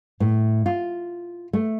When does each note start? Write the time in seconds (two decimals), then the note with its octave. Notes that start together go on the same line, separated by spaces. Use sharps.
0.20 A2
0.66 F4
1.53 A3